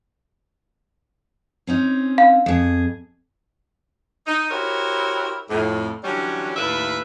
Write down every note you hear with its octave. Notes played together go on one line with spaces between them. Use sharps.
C4 C#4 D#4
F5
F2 G#4
D#4
E4 F#4 G4 A#4 C5 C#5
F2 A2
D3 E3 F#3 G3 C#4
D#2 A2 E4 B4 E5 F5